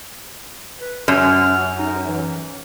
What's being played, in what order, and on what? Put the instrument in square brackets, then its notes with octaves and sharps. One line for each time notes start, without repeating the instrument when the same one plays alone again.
[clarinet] B4
[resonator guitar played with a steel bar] F#2 [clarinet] F6
[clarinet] D#4
E3